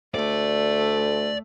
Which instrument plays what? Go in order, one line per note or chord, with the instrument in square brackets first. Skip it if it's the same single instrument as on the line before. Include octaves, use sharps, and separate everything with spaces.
[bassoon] D2 [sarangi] A3 [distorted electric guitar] D5